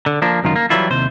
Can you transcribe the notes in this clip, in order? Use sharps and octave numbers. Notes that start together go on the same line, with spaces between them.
D3
F3 A#3 D4
C#2 F#2 D#3 F4
A#3
E3 F#3 G3 A#3 E4 F4
D#2 C3 C5